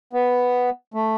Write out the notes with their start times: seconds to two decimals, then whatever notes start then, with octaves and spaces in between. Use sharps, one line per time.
0.13 B3
0.94 A3